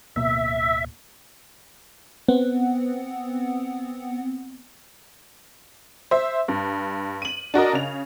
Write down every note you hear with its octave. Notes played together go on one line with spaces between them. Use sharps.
D1 B2 A#3 E5
B3 C4 F#5
C5 E5
G2
D#7 F#7
D4 F#4 A#4 D#5
C#3 F7